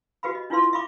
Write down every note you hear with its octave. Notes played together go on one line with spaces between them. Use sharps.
F#4 G4 B4 F5 B5
D#5
D4 E4 F4 B4 F5 C6
E5 F5 B5 C#6 D6